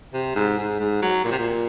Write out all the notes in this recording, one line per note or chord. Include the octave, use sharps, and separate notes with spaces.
C3
G#2
G#2
G#2
F#3
A#2
C3
A#2